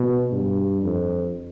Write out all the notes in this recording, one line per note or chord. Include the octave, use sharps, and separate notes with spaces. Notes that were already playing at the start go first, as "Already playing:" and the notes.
Already playing: B2
G2
F2